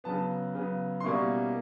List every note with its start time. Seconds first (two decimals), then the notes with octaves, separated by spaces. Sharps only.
0.04 C#3 F#3 B3 A5
0.55 C#3 F#3 B3
1.00 C6
1.04 B2 G3 A#3 C#4 E4 C#6